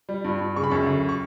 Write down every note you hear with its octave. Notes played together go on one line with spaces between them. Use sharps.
G3
G2
G2
C#3 C#6
B5
F#2 C#6
D2
C#6